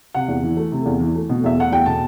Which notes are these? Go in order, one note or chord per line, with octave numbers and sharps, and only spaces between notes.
C3 F#5
E2
E3
A3
C3
E2
E3
A3
B2
E2 E5
A3 F#5
E2 G5
B2 A5